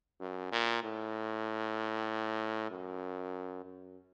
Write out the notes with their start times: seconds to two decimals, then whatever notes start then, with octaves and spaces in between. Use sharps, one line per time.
0.20 F#2
0.52 A#2
0.83 A2
2.70 F#2
3.65 F#2